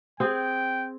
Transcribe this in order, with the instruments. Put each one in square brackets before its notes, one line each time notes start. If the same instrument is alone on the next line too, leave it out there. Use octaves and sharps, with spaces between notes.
[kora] C4 G#4 [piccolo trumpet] G5